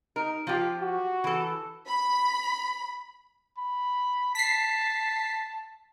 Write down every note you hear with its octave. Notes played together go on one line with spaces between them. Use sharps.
D#4 A#4
F3 F4 G4
F#4
E3 A4
B5
B5
A5 B6 C7